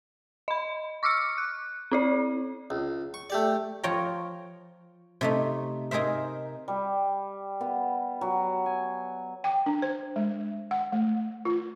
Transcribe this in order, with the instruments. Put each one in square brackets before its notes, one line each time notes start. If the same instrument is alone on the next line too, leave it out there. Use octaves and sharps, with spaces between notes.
[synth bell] D#5 B5
C#6 D6 E6 F6 C#7
F#6
C4 E4 D5
[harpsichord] C#2
C#6
A3 G4 D5
[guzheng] F3 F4 C#5 G5 A#5
C3 A3 D#4
D#4 G#4 A#4 C5 E5
[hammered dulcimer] G3
B3
F#3
G#5
[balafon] G5
D4
C5
G#3
F#5
A3
F4